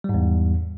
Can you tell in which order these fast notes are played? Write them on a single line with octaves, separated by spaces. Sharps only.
G3 G#2 E2